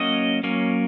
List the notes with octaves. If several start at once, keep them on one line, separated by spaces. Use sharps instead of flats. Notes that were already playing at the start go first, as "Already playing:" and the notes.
Already playing: F#3 A#3 C#4 D#5
F#3 A#3 C#4